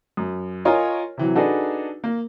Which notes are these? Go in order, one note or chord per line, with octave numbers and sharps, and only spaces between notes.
F#2
F4 A#4 C#5 D#5 G#5
C3 E3 F#3
D4 D#4 F#4 G#4 A4 B4
A#3